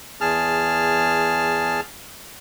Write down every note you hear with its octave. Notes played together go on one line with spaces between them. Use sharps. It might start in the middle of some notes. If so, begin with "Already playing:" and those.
E2 G#4 A5 F6